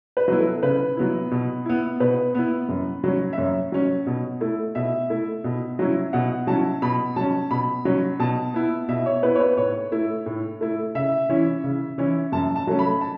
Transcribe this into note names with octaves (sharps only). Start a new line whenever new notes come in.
B4
F#3 B3 E4
A4
C#3 B4
F#3 B3 E4
B2
B3 E4
B2 B4
B3 E4
F#2
F#3 C#4
E5
F#2 C#5
F#3 C#4
B2
A3 E4
B2 E5
A3 E4
B2
F#3 C#4 E4
B2 F#5
F#3 C#4 E4 A5
B2 B5
F#3 C#4 A5
B2 B5
F#3 C#4
B2 A5
B3 E4
B2 E5
C#5
B3 E4 B4
C#5
B4
A2 C#5
A3 E4
A2
A3 E4
C#3 E5
E3 C#4 E4
C#3
E3 C#4 E4
F#2 A5
A5
F#3 A3 C#4
B5
A5